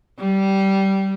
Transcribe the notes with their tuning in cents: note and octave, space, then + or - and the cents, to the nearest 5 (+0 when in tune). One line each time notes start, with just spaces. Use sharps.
G3 -15